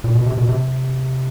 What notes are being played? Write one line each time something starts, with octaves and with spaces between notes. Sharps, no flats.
A#2
B2
C3
B2
C3